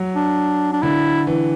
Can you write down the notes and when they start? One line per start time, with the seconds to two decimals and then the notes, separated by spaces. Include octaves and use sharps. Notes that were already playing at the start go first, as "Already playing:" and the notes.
Already playing: F#3
0.16 D4
0.73 D4
0.83 D3 E4
1.27 E3